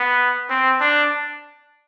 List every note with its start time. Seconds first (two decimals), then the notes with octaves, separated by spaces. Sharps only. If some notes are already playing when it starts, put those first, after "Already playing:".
Already playing: B3
0.50 C4
0.81 D4